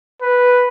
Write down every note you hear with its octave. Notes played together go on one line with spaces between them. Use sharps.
B4